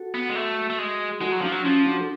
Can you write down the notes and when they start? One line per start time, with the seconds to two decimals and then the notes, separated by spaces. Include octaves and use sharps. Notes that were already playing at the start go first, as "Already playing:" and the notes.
Already playing: F#4 A4
0.14 B3
0.29 G#3
0.35 A3
0.70 A3
0.79 G#3
1.21 G#3 F#4 A4
1.32 F#3
1.41 F3 D4 F#4
1.52 F#3
1.64 F3 C#4 F4
1.86 D4 F#4
2.01 A4